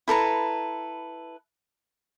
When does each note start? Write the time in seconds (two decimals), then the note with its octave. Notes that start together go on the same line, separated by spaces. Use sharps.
0.08 E4 A4 B4 A#5